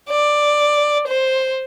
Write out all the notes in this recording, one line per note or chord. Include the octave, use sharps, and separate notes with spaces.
D5
C5